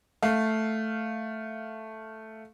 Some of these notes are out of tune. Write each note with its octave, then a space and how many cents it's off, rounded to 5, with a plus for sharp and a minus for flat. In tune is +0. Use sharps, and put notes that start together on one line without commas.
A3 +0 F5 +0